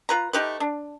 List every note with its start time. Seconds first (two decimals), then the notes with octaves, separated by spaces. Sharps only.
0.09 F4 B4 A#5
0.33 A3 D#4 G4 B4
0.60 D4